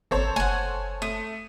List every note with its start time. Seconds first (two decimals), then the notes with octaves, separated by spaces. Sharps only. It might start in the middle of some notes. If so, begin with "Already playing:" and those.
0.11 G#1 A4 C5 C#5
0.36 F#1 F#5 G#5
1.02 A3 D#6